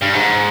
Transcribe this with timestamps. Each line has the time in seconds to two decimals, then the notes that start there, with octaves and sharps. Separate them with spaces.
0.02 G2
0.15 G#2